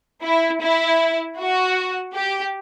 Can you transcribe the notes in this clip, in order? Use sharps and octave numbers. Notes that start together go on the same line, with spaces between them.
E4
E4
F#4
G4